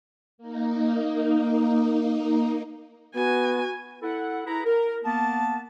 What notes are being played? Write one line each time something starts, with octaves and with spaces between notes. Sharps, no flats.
A#3 D#4
B3 F#4 G#5
E4 A4 F#5
E4 G#4 B4 A#5
A#4
A#3 B3 A5